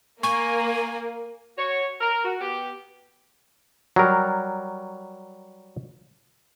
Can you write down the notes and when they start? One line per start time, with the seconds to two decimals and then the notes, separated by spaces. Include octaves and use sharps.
0.23 A#3 G#5 C#6
1.57 F#4 C#5
2.01 A#4
2.25 F#4
2.41 B3 G4
3.96 F#3 G3 A#4